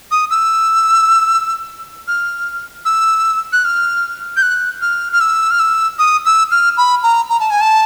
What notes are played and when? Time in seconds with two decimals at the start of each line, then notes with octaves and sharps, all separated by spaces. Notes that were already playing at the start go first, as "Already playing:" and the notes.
0.11 D#6
0.31 E6
2.08 F6
2.85 E6
3.53 F#6
3.65 F6
4.37 G6
4.42 F#6
4.81 F6
5.13 F6
5.21 E6
5.51 F6
5.60 E6
5.99 D#6
6.25 E6
6.51 F6
6.77 B5
7.03 A#5
7.29 A#5
7.40 A5
7.51 G#5
7.61 A5